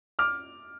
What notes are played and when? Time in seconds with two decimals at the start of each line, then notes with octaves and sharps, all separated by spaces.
0.19 D6 F6